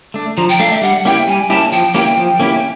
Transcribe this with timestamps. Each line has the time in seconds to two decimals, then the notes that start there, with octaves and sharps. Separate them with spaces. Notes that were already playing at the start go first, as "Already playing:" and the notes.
0.14 A3 D4
0.37 F3 A#5
0.49 G5
0.59 A3 D4 F5
0.71 E5
0.82 G3 F#5
1.05 A#3 C#4 E4 G4 G5
1.27 G3 G#5
1.50 A#3 C#4 E4 G4 A5
1.72 F3 G5
1.94 A#3 C#4 E4 G4 G5
2.17 F3
2.40 A#3 C#4 E4 G4